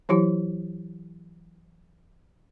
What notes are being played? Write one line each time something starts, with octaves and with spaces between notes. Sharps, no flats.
E3 F#3 E4 G4